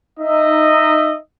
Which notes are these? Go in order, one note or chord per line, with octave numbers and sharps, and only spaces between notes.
D#4 D#5 E5